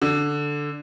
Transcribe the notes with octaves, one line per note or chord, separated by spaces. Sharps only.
D3